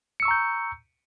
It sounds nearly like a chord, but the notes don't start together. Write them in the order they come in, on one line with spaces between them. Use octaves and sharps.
C#7 E6 C#6 A#5 G6